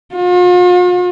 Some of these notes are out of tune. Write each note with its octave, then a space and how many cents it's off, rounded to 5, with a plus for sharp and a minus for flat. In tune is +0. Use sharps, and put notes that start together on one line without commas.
F4 +45